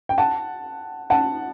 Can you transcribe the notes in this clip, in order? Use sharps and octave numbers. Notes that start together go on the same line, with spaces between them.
G5
F#5 A5
F#5 A5